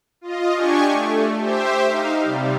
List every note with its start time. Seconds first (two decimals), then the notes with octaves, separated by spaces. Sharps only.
0.21 F4 D#5
0.55 D4 G4 G#5 C#6
0.91 A3
1.39 G4 C5 E5
1.88 D#4 F5
2.23 C3 G3